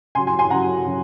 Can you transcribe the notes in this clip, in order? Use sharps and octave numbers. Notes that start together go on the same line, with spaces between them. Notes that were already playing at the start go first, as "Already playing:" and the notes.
C#3 F#3 G#5 C6
G#5 C6
G#5 C6
C#3 F#3 F#5 A#5
C#3 F#3